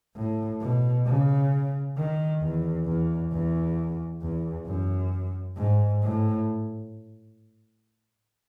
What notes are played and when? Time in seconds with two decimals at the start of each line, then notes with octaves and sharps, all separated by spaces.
0.16 A2
0.61 B2
1.05 C#3
1.97 D#3
2.42 E2
2.86 E2
3.32 E2
4.22 E2
4.67 F#2
5.57 G#2
6.02 A2